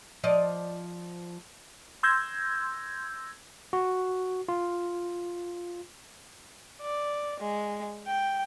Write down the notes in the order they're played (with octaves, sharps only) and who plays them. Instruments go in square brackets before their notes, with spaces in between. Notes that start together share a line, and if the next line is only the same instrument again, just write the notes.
[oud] F3 D5 D#5
[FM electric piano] C6 E6 G6 G#6 A#6
[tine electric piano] F#4
F4
[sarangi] D5
G#3
G5